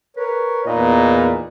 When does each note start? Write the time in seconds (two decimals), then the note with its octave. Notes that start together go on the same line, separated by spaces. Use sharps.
0.17 A#4 B4 C#5
0.66 E2 A#2 D#4 B4 D#5